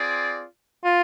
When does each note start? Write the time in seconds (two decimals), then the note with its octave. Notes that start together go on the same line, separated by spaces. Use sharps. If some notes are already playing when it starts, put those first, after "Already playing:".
Already playing: C4 F4 G#4 D5
0.84 F4